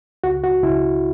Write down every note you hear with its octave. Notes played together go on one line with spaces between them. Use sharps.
C#2 F#4
F#4
C#2 E4